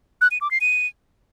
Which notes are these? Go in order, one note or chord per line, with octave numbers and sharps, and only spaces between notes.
F#6
D#7
D6
C7
D#7